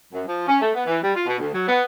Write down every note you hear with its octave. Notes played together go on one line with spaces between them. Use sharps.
F#2
F3
C#4
A3
B3
E3
G3
F4
B2
D2
F#3
B3